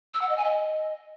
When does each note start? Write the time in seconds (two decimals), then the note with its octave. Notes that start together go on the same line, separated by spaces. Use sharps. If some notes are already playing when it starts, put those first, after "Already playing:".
0.14 E6
0.22 F#5
0.29 D#5
0.37 G#5
0.44 D#5